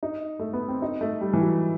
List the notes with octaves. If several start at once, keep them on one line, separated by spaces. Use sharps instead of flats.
D#4
A3
B3
C4
D#4
A3
G3
E3
F#3